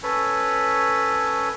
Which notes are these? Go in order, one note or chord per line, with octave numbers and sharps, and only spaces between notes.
C#4 A4 B4 C#5